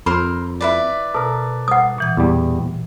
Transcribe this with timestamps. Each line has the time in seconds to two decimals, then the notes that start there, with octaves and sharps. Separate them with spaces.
0.06 F2 A#4 C5 B5 C6
0.61 E4 B4 D5
1.15 B2 A4 A#4
1.68 F#5 D#6
1.98 A#2 E3 G#6
2.17 E2 G3